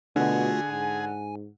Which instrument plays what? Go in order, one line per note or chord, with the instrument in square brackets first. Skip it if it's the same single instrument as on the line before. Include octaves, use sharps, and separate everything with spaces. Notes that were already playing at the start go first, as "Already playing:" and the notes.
[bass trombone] B2 [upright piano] D3 [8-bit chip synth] A3 F4 F#4 [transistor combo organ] G#4
[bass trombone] G#2 [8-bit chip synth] G#5